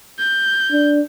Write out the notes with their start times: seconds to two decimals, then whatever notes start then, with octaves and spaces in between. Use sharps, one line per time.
0.19 G6
0.72 D4